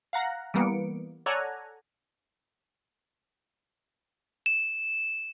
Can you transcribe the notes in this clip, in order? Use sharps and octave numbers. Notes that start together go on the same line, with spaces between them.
F5 F#5 A#5 F#6
E3 G3 A#3 B3 C#7 D7
A4 C#5 D5 F#5 G#5 A#5
E7